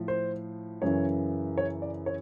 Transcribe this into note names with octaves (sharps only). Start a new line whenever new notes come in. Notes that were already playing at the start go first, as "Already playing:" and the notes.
Already playing: A2 F3
C5
F#2 C#3 E3 C#5
C#5
D5
C#5